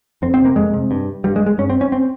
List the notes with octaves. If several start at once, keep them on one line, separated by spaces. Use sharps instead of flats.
F2 C4
C4
C3
A#3
F2 G#3
C3
G2
G2 G3
G#3
G#3
G2 C#4
C4
C#4
C4